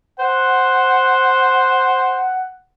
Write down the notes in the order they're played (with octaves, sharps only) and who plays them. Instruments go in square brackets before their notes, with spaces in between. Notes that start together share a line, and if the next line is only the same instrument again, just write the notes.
[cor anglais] C5 [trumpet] F#5